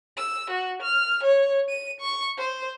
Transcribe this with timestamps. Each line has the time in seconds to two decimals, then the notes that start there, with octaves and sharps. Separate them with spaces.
0.17 E6
0.50 F#4
0.82 F6
1.23 C#5
1.69 D#7
2.00 C#6
2.37 C5